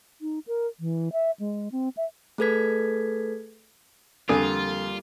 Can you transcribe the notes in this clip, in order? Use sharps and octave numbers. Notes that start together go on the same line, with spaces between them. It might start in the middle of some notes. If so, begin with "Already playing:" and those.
D#4
A#4
E3
E5
G#3
C4
E5
A3 G#4 A4 B4 G#6 B6
F2 D3 G3 A#3 F4 A4 G#5